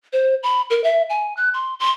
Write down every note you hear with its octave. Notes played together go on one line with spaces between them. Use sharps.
C5
B5
A#4
E5
G#5
F#6
C6
C6